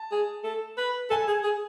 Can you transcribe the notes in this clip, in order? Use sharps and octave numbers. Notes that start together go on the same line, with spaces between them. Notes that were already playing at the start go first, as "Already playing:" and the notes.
Already playing: A5
G#4
A4
B4
A4 G#5
G#4
G#4